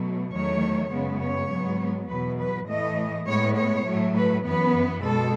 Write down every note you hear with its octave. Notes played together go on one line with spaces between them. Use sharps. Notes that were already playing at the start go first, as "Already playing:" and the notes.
Already playing: B2 F#3 A3
E2 D#3 F#3 A3 C#5
F#2 C#3 G#3 B3
C#5
G#2 F#3 B3
E2 B2 F#3 B4
B4
A2 E3 A3 D#5
A2 G#3 B3 C#5
C#5
A2 F#3 A3
B4
F#2 E3 B3 B4
B2 G#3 A4